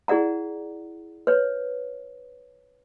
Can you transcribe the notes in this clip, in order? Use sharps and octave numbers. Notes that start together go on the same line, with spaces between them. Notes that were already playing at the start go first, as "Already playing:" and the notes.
E4 G#4 D5 F#5 A#5
B4 C#5